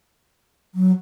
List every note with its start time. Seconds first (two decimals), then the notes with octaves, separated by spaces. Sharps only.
0.75 F#3